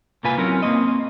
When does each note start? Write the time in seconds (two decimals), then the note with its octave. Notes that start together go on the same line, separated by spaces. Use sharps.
0.23 C2 G#2 A#3 F4 B4 G#5
0.38 F#3 C4 C#4 E4 A#4
0.63 A#3 C4 D#5